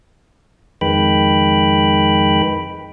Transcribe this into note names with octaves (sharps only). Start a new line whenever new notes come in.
F2 D#3 G#3 B4 G5 B5